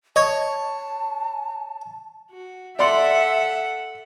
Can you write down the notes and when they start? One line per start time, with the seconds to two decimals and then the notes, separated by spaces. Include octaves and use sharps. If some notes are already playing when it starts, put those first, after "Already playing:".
0.16 C#5 D#5 A5 G#6
2.31 F#4
2.79 A4 D5 E5 F#5 C6